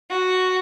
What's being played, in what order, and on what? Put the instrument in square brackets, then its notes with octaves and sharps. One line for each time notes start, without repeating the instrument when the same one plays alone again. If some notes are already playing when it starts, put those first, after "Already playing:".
[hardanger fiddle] F#4